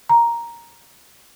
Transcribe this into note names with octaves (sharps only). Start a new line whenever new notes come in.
A#5